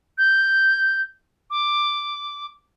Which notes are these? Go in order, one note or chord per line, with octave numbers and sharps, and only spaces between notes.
G6
D6